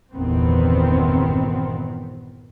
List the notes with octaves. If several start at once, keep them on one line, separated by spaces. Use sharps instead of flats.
G1 E2 A#2 D#3 B3 C4